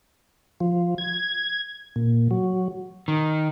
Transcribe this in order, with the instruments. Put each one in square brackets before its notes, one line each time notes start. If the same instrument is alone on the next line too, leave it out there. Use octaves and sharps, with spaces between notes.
[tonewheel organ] F3
G#6
A#2
F#3
[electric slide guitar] D#3